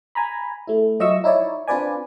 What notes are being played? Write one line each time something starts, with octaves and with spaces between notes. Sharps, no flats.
G#5 A#5 B5
A3 E4
F#3 F4 D#5 E5 C#6 E6
D#4 E4 C#5 D5
C4 D4 F4 B4 D5 G#5